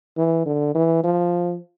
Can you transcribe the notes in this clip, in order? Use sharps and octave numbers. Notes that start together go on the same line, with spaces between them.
E3
D3
E3
F3